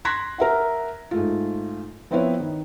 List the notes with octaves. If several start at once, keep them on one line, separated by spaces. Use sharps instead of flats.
C6 F#6 G#6 A#6 B6
A#4 E5 F#5
G#2 A3 F4
F3 B3 C4 E4 B4 C#5
D#3